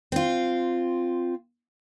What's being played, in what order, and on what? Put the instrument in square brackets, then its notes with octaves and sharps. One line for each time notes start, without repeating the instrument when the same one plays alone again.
[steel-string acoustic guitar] C4 F4